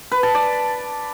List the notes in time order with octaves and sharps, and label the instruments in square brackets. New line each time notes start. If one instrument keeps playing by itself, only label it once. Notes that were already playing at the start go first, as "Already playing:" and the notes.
[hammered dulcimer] B4
A5
D5